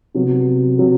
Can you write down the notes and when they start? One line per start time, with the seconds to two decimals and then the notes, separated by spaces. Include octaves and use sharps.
0.14 C3 F#3 B3
0.78 C3 F#3 B3